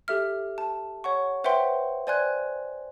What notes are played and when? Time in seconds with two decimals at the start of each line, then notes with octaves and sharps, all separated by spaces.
0.08 G4 A4 E5 F6
0.58 A5
1.04 C#5 F#5 C#6
1.44 B4 C5 E5 F#5 G5 C6
2.07 C5 D5 G#5 C6 F#6 G#6